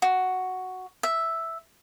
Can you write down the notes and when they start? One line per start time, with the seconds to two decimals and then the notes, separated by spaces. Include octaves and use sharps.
0.02 F#4
1.03 E5